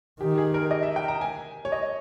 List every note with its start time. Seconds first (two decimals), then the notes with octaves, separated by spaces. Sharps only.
0.20 D#3 G4
0.38 G#4
0.54 A#4
0.71 D#5
0.83 E5
0.96 G5
1.08 A#5
1.21 G#5
1.65 C#5
1.72 D#5